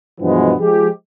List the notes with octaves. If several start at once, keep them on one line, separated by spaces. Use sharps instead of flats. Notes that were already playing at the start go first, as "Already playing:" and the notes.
G2 B2 E3 F3 G#3 B3
F3 G#3 G4